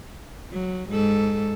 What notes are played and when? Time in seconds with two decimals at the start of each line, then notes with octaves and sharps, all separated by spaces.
0.51 F#3
0.90 G#2 A4